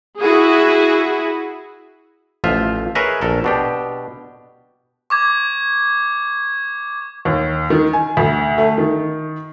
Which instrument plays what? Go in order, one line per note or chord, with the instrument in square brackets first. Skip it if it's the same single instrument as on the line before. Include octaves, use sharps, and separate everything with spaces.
[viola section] E4 F#4 G#4
[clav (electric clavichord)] A1 F3 F4 E5
G#4 A#4 B4 C#5 D#5 E5
A#1 A4 A#4
B2 D4 G4
[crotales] C#6 D6 G#6
[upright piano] D#2
D#3
G#5
D2
A3
D#3